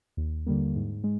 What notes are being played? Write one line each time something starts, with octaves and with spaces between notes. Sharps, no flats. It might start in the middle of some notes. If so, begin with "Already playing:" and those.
D#2
D3 G3 A#3
G#2
G#3